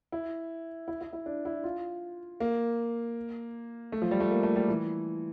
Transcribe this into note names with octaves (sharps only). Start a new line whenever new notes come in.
E4
E4
E4
E4
D4
E4
F4
A#3
A3
F3
G3
A3
A#3
A3
G3
E3